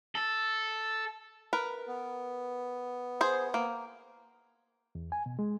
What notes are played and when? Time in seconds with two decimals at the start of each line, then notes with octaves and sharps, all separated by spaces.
0.15 A4
1.53 A#4 B4
1.87 B3
3.21 G#4 C5
3.54 A#3
4.95 E2
5.12 G#5
5.26 B2
5.39 G#3